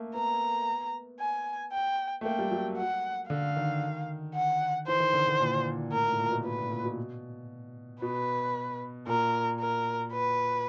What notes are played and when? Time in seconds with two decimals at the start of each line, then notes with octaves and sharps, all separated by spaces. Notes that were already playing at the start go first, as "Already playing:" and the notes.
Already playing: A3 A#3
0.14 B3 A#5
1.20 G#5
1.72 G5
2.21 A3
2.24 A#3 G5
2.39 G3
2.51 F#3
2.77 F#5
3.30 D3 F5
3.56 D#3
4.35 F#5
4.87 E3 C5
5.00 D#3
5.13 D3
5.27 D3
5.40 A#2
5.92 A2 A#4
6.05 A#2
6.12 A2
6.19 A#2
6.32 B2
6.44 B2 B4
6.58 A#2
6.71 A#2
6.85 B2
8.02 B2 B4
9.07 A#2 A#4
9.60 A#4
10.12 B4